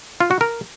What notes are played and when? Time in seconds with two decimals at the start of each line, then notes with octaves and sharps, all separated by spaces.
0.20 F4
0.31 F#4
0.41 A#4